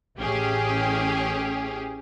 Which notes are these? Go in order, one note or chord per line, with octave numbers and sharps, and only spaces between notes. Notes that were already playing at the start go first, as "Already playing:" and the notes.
A1 C#4 G4 G#4